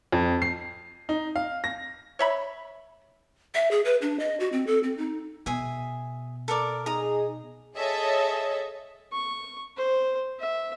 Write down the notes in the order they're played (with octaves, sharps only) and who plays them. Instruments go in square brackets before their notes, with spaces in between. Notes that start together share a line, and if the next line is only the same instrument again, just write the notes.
[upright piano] F2
C7
D#4
F5
A#6
[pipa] C#5 E5 B5
[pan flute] E5
G#4
B4
D4
D#5
F#4
C4
A4
C4
D#4
[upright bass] B2 [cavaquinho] G#4 E5 G#5
[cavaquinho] A4 A#4 D5
[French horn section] D#4 G#4 [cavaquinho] A#5 D#6
[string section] G#4 A4 C#5 D#5 E5
[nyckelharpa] C#6
C5
E5